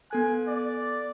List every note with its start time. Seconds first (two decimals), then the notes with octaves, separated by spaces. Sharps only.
0.11 B3 A4 G#5 F#6
0.47 D5